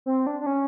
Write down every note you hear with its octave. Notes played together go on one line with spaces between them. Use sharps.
C4
D4
D4
C#4